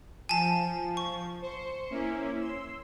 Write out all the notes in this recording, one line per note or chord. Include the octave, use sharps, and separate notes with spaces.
F3 G#5 A5
C#6
C5 C#7
A#3 C#4 E4
C6 E6